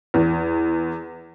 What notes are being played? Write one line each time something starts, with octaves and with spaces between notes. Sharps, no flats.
E2